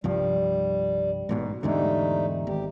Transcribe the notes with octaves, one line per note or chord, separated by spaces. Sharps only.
C2 G2 F3 G3
A1 G#2 B2
E2 G#2 D3 G3 A3 D#4
G#1 G4